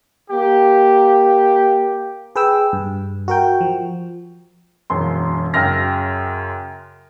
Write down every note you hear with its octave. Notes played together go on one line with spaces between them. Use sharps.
A#3 G4
G#4 B4 G5 E6
G2
F#4 A#4 G5
F3
E1 F#2 C6
F#2 C#3 G5 C6 F6 A#6